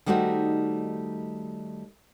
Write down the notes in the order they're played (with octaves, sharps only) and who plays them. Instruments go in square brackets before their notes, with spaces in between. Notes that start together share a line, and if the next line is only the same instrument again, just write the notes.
[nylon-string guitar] D#3 G3 A3 D#4 F#4 C5